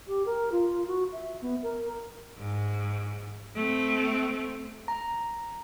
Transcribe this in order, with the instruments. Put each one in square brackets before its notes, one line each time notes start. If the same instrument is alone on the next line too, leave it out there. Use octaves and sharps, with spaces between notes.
[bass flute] G4
A#4
F4
F#4
E5
B3
A#4
[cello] G#2
A3 C4
[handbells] A#5